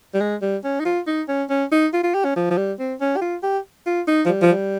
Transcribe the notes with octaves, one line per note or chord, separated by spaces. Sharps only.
G3
G#3
G3
C#4
D#4
F4
D#4
C#4
C#4
D#4
F4
F4
G4
C#4
F3
F3
G3
C4
C#4
G4
F4
G4
F4
D#4
F3
G3
F3
G3